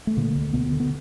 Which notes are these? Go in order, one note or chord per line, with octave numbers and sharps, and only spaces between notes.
A3
A#2 D3 A#3
D2
D2 B2 B3
D3
B3